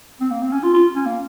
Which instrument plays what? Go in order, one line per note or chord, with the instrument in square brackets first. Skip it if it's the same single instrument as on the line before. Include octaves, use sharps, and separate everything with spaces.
[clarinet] C4
A#3
C4
C#4
F4
F4
C#4
A#3